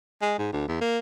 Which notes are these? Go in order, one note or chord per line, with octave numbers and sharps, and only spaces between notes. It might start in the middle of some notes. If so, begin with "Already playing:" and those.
G#3
G#2
D2
E2
A#3